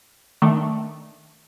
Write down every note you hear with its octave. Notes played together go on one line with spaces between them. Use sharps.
D#3 A3 D4